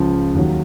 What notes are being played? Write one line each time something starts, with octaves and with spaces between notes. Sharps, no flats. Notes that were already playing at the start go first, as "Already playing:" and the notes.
Already playing: C#2 C#3 F3
D#2 D#3 F#3